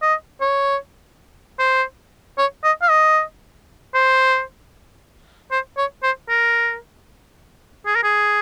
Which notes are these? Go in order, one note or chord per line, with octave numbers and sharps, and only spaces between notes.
D#5
C#5
C5
C#5
D#5
F5
D#5
C5
C5
C#5
C5
A#4
G#4
A#4
G#4